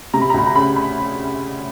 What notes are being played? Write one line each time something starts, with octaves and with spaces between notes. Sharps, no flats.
C3 A#5
B5
A#5
D2 B5
A#5
C#3 B5
B5